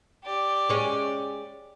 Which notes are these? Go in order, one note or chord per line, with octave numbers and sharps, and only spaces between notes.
G4 D5
G#3 C#4